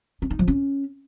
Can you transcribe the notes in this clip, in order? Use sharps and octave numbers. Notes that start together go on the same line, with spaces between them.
C#4
D#4
F3
C#4